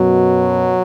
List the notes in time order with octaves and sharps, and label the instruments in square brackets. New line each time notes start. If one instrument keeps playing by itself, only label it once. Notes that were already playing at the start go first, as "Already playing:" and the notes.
Already playing: [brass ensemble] F#2 B2 [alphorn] F#3